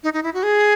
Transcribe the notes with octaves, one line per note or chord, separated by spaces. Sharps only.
D#4
D#4
E4
F#4
G#4